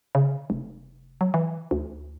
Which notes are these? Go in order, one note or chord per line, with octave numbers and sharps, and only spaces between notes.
C#3
F1
F#3
E3
D2